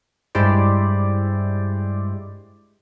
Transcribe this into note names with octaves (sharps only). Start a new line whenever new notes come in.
G2 G#3 E4 G4 C5 D5